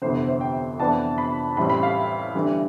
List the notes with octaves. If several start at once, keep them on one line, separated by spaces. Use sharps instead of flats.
G1 F2 C3 E3 B3 C5
C5
G5
F2 E3 B3 D4 A5
B5
A1 A2 G3 C4 B5
B5
F5
E5
G1 G2 E3 G3